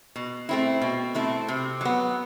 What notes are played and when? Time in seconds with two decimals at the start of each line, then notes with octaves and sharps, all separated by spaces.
0.16 B2
0.49 A3 C4 E4
0.81 B2
1.15 A3 C4 E4
1.48 C3
1.81 F#3 B3